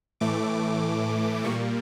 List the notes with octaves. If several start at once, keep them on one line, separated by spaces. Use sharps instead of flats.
A2 E3 A3 D6
A#2 G3 A#3 C#6